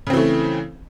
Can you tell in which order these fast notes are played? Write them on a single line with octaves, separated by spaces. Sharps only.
C#3 C4 E3 A3